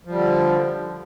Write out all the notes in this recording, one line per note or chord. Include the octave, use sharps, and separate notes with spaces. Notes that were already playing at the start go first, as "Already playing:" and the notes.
D3 F3 G3